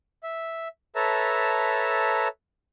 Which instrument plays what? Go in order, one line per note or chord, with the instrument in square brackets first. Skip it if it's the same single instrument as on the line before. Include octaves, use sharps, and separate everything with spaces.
[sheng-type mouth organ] E5
A4 B4 C#5 E5 A5 A#5